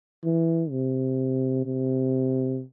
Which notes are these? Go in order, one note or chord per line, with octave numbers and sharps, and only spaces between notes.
E3
C3
C3